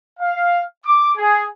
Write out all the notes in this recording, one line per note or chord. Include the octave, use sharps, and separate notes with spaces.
F5
D6
G#4